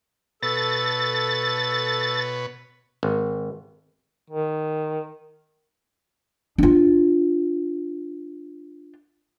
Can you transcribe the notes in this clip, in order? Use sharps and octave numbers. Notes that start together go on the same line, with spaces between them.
B2 A4 B4 C#5 A6
G#1
D#3
D4 F4